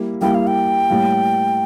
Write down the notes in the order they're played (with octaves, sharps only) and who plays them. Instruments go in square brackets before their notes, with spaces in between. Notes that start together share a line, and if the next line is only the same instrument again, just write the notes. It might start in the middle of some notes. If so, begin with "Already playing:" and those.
Already playing: [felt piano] G3 A#3 E4
[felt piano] G3 A#3 E4 [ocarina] G5
[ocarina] F5
G5
[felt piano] A2 G3 A#3